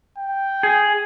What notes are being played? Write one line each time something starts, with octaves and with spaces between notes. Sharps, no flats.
G5
G#4